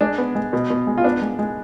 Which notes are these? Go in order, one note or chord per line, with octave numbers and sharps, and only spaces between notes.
G#3 D4
B3
G#3
B2
B2
G#3
F4
B3 D4
G#3
G#3